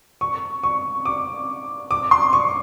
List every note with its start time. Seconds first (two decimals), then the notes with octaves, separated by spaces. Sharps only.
0.21 C#6
0.63 C#6
1.05 D6
1.91 D6
2.11 C6
2.33 C#6